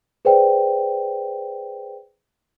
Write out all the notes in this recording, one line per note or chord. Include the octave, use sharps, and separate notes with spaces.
G#4 B4 C5 D5 G5